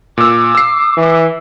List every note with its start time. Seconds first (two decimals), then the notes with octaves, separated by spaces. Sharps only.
0.17 A#2 D6 E6
0.55 E6 C7
0.97 E3